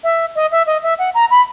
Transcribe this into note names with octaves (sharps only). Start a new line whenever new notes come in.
E5
D#5
E5
D#5
E5
F#5
A#5
B5